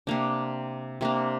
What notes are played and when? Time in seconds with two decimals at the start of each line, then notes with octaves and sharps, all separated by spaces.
0.07 C3 A#3 D4
1.01 C3 A#3 D4